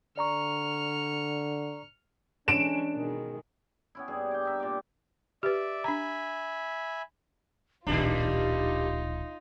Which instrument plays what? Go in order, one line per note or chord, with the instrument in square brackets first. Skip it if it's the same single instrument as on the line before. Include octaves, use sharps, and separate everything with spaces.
[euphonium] D3 [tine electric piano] D5 A#5 C#6 [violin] F6 C#7
[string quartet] E3 G#3 C#4 [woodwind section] D4 [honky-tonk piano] D7 E7
[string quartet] B2 D#3 G#3
[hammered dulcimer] B3 C#4 E4
G2 G#4
D5 G5
D#4 E5
A#2 G4 D6
[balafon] G4 B4 [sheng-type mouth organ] D5 E5
[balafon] D4 A#5 [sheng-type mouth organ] E5 G#5 B5
[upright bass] D1 A#1 [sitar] D#3 G3 D4 [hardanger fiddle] D#4 F4 [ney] G4